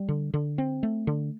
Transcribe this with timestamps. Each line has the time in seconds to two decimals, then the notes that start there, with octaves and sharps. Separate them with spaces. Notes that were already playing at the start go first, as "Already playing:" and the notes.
Already playing: G3
0.08 D3
0.34 D3
0.58 C4
0.83 A3
1.07 D3